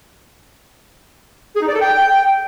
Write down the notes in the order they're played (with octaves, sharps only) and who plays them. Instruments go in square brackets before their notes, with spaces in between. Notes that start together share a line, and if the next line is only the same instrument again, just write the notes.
[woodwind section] G#4
D#4
D5
A4
G5